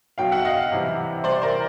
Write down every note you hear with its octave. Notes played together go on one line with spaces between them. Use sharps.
B2 F#3 F5 G5
E5 F#5
D#5 F5
C3 E3 G3
C3 E3 G3 C5 D5
A#4 C5